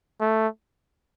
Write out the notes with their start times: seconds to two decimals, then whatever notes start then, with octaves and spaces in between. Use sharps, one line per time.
0.21 A3